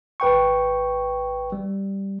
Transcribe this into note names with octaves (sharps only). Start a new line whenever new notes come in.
G#1 B4 G5 C#6
G3